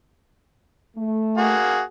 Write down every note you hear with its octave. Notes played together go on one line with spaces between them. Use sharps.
A3
A#3 F#4 G#4